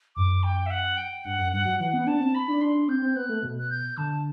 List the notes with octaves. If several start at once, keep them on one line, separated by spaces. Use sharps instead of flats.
F#2 D6
G5
E5
F#5
G5
G2 F#5
F#2
G2 F#5
F#3
E3 F#5
B3
D4 A5
C4
B5
D4
D4 C6
D4
C4 G6
C4
B3 F#6
A3
B2
F#6
G6
D3 A5